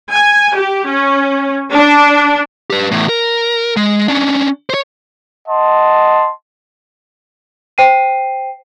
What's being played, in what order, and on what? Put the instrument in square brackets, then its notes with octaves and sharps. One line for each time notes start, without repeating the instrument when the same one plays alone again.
[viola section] G#5
G4
C#4
D4
[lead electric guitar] G4 B4
E2 A2
A#4
G#3
C#4 D4
C5 C#5
[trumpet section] D#5 F#5 A5 C6
[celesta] C5 G5 C7 D#7